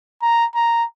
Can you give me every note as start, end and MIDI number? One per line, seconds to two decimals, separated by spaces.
0.22 0.45 82
0.55 0.84 82